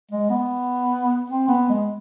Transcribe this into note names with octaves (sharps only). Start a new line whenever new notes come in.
G#3
B3
C4
B3
G#3